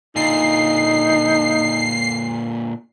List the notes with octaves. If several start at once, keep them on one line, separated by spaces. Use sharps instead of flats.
A#2 D3 D#4 C7